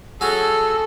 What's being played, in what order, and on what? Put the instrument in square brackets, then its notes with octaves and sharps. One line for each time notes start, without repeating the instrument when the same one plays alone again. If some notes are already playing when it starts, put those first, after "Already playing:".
[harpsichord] F#3 C#4 F#4 [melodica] G#4 E6 [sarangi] A4